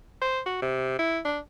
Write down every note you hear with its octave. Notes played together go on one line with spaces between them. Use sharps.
C5
F#4
C3
E4
D4